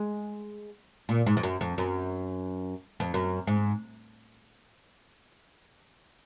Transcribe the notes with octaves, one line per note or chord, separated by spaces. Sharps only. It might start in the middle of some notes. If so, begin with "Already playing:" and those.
Already playing: G#3
A#2
G#2
F2
F#2
F2
F#2
F2
F#2
G#2